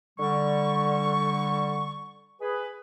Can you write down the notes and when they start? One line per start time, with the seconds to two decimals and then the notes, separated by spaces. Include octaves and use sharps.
0.18 D3 G3 C#6
2.41 G#4 B4